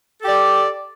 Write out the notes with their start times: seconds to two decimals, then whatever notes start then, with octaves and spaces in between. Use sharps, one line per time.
0.22 A4
0.25 G4
0.28 D5